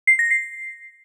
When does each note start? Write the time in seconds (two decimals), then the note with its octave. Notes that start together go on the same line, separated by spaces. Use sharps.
0.07 C7
0.19 A#6
0.31 C7